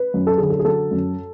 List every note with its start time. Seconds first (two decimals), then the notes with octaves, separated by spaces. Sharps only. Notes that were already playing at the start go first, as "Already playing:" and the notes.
Already playing: B4
0.14 F#2
0.27 A4
0.38 D3 G#4
0.50 A4
0.59 G#4
0.65 F#3 A4
0.91 F#2